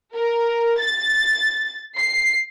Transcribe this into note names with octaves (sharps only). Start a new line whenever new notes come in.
A#4
A6
C7